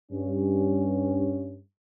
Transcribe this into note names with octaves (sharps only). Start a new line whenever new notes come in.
G2 C#4